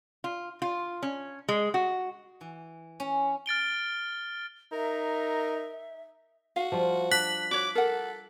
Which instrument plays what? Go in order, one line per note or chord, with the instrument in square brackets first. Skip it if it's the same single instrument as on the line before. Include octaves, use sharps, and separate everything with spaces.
[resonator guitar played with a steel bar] F4
F4
C#4
G#3
F#4
[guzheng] E3
C#4
[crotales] F6 A6 D7 G7
[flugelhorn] D#4 [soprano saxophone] A#4 [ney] E5
[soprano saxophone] F#4 [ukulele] F5
[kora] F3 G3 F4
[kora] D4 [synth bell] F#6 B6 F#7
[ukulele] F#4 C#5 [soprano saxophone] D6
[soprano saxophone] A4 [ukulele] A#4 F#5